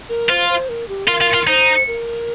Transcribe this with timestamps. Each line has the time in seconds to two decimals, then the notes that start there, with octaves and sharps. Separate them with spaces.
0.09 A#4
0.30 F4 C5
0.49 C5
0.69 A#4
0.88 G4
1.08 F4 A#4
1.21 F4
1.34 F4
1.47 D#4 C5
1.87 A#4